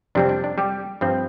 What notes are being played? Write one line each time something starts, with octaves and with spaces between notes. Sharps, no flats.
F2 C3 G3 C4 D4
D4
D4
G3 G4
G2 F3 C4